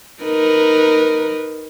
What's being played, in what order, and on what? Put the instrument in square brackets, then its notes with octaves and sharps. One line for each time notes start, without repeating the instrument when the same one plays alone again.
[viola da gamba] D#4 A#4 B4